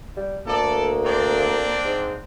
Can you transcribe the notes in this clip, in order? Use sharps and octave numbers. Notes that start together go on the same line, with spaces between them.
G3
D2 A#3 A4 D5
C4 D4 D5
G#2